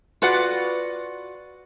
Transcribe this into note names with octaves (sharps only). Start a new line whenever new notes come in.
F4 F#4 B4 D5 F#5